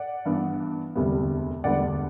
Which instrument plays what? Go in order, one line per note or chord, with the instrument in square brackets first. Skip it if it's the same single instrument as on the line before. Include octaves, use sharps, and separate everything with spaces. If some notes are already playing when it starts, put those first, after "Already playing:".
Already playing: [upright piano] D5 F#5
G2 E3 B3 D4
E1 D2 C3 G3 B3
E1 D2 D3 G3 B3 D5 F#5